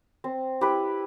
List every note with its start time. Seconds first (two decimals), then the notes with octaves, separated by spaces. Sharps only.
0.24 C4
0.61 E4 G4 B4